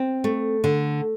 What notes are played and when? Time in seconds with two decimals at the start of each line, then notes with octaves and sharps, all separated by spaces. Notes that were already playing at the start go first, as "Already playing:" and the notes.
Already playing: C4
0.24 A3
0.64 D3